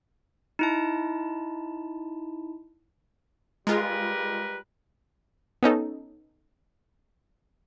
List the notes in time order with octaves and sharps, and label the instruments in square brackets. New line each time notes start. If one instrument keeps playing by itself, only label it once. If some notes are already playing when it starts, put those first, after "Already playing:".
[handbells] D#4 E4 A5
[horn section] G3 A#4 B4 [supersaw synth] G#3 F4
[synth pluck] B3 C#4 D#4 A4